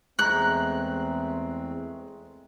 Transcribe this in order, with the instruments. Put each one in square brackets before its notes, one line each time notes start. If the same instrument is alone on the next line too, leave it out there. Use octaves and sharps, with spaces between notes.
[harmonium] E2 A3 C4 [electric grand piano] G#3 A#5 [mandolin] F#6